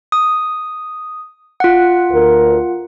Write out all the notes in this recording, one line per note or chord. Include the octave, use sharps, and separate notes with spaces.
D#6
F4 F#5
D2 A#4